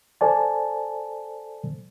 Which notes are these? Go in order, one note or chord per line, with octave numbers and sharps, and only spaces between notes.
A4 C5 D5 G#5 A5